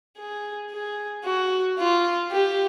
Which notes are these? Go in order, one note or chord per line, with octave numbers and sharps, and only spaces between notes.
G#4
G#4
F#4
F4
G4